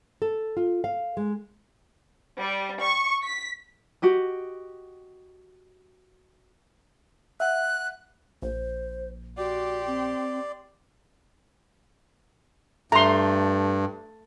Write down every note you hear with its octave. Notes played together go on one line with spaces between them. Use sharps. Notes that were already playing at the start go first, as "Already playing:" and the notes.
A4
F4
F5
G#3
G3
C#6
B6
F#4 G4 D#5
E5 F#5 F#6
A#1 C5
F#4 G4 D5 C6
C4
G2 A3 A#5 C6